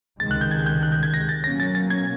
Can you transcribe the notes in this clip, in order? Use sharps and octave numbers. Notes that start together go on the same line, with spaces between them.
C#2 C3 D#3 G#3 A6
F#6
G6
G#6
G6
F#6
G6
G#6
A#6
A6
B2 F#3 A#3 C#4 A#6
A6
A6
G#6